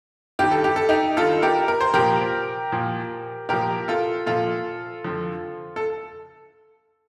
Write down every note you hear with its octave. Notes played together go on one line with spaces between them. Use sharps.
G2 D#3 G4
A4
G4
A4
D#4 G4
G2 D#3 F4 A4
G4 A#4
A#4
C5
A#2 F3 G4 A#4
A#2 F3
A#2 F3 G4 A#4
F4 A4
A#2 F3 F4 A4
F2 D3 F3
A4